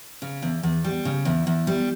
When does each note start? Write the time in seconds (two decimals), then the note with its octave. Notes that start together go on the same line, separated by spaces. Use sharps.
0.22 C#3
0.42 E2
0.63 E2
0.84 G3
1.05 C#3
1.25 E2
1.47 E2
1.67 G3